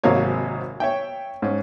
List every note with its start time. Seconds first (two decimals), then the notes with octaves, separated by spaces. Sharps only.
0.03 G#1 G#2 C3 F#3 A#3 C#5
0.80 C#5 E5 G5
1.42 G#2 C#4